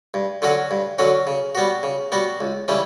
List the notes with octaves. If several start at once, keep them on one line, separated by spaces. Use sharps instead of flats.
G2
D3 F#3 C#4 F#4
G2
D3 F#3 C#4 F#4
C#3
G3 B3 F#4
C#3
G3 B3 F#4
C#2
C#3 E3 G3 C#4